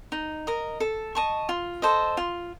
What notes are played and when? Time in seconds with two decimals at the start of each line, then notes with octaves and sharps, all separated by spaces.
0.12 D#4
0.47 A#4 D#5
0.80 A4
1.15 D#5 A5 C#6
1.49 F4
1.82 A4 C5 D#5
2.17 F4